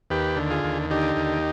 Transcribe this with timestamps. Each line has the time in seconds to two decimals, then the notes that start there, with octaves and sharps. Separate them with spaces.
0.10 D#2 G4 B4
0.36 D3
0.50 F4 G#4
0.64 D#2
0.90 D3 D#4 G4
1.16 D#2